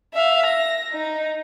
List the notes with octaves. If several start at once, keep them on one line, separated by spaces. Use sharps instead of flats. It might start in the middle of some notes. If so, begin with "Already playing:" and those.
E5 F5
A#6
D#4